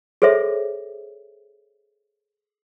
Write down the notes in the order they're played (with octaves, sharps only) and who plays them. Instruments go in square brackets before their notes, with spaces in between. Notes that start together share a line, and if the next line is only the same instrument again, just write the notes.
[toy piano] G#4 A4 C5 C#5 E5